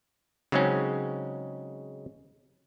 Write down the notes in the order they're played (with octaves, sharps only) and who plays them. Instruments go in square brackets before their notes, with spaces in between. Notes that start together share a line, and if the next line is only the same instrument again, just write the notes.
[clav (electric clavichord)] C#3 F#3 G#3 C4 C#4 D#4